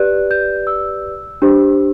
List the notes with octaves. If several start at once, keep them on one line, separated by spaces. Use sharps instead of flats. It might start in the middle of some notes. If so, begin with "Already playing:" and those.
Already playing: G4 B4 D5 F#6
G6
E6
D4 G4 C5